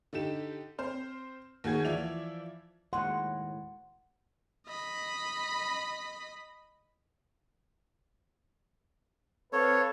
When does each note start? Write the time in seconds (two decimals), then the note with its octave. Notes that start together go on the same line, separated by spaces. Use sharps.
0.13 D3 D#4 G4 E7
0.78 C4 C5 F6
1.64 D#2 F#4 G#4 G#6
1.85 E3 F3 D5 E5 F7
2.93 D#2 A2 G#3 F#5 C6
4.67 D#5 B5
9.53 C4 A4 B4 C#5 F5